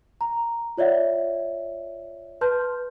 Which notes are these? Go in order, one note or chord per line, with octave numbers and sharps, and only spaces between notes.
A#5
F4 C#5 D5 E5 F#5
B4 A5 C6 F6 G6